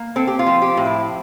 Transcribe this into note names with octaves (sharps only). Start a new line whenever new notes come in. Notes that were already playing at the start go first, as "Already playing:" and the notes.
Already playing: A#3
C4 A4
G4
F4
F3
G4
A2
E4